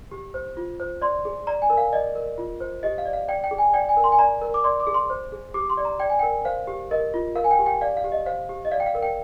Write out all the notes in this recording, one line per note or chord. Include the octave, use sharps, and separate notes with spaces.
G4
C5
F4
C5
D5 C6
G#4
D5 A#5
G#5
A#4
F5
D5 D#5
A#4
F4
C5
G4 D#5
F5
D5
F5
D5 G5
G5
G#4
G#5
D5 G5
G#5
A#4
C6
G#5
D5 A#5
A#4
D6
D5 C6
D6
G#4
C6
C5
G#4
G4 D6
C6
D5
A#5
D5 G5
G#5
A#4 G5
C5 F5
G4
A#4 D#5
F4
A#4 F5
G#5
G5
G4
G5
D5 F5
F5
G4
D#5
C5 F5
G4
D#5
D5 F5
G5
F5
A#4
G5